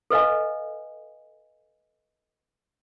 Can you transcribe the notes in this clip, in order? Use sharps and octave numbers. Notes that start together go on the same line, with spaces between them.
A4 B4 D#5 F5 G#5